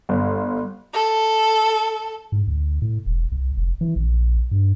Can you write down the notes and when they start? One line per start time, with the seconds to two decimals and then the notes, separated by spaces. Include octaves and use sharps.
0.09 G1
0.94 A4
2.32 G#2
2.48 D2
2.82 A2
3.06 E1
3.32 C2
3.57 F1
3.81 E3
3.96 A#1
4.51 G2